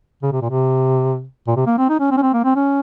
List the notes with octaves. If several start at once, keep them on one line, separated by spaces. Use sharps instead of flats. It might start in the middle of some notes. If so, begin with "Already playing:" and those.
C#3
C3
A#2
C3
A#2
C3
A#3
C4
D#4
C#4
C4
C#4
C4
A#3
C4
C#4